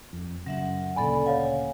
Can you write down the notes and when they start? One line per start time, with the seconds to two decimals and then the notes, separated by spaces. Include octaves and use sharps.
0.13 F2
0.46 F#2 C#3 F#3 E5 F#5
0.96 D2 A#2 C#3 A4 D5 G#5 B5
1.26 C#5 F5 F#5 G#5